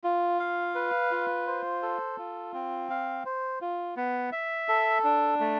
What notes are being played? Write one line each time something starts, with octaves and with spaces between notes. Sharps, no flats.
F4
F5
B4
F4
C5
A4
F4
C4
F5
C5
F4
B3
E5
A4
D4
A3